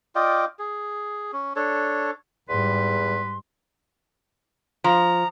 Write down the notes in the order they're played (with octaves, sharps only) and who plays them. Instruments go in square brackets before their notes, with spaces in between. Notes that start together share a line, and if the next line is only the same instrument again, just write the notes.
[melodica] F4 D5 D#5 G5
G#4
C#4
D4 A4 C#5
[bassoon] E2 [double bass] G#2 G3 [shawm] B4 [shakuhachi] C6
[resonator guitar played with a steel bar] F3 [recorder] A#5